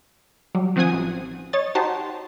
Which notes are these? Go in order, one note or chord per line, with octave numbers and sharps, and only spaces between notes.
F#3 G3
D#3 F3 C4 F#5 G#5 D#6
A1
C#5 D#5 A6
D#4 F#4 G4 C5 A5